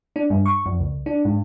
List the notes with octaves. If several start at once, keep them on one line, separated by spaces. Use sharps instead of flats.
D4
G2
C#6
F2
C#2
D4
G#2